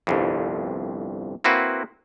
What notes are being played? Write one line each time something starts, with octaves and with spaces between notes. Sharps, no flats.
G1 C2 F2
A#3 C4 E4 F#4 B4